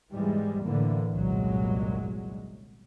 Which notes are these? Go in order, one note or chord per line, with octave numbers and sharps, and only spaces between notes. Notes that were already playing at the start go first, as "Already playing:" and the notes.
E2 G#2 E3 G3 G#3
A2 D3 E3 A#3
G1 C2 A#2 F#3 G#3